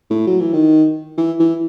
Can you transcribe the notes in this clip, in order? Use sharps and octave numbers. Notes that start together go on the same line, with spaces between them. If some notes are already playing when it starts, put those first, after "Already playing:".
A2
F#3
E3
D#3
E3
E3